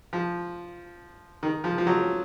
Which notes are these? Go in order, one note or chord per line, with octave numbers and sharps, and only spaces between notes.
F3
D#3
F3
F3
F#3